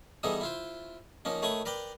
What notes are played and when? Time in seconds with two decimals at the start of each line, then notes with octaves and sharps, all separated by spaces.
0.23 E3 G3 B3 D#4 G#4 A4
0.41 E4 F4 C5
1.25 F3 A#3 C#4 D#4
1.42 D#3 A3 C#5 B5 C#6 D#6
1.65 A#4 B4 D5 G5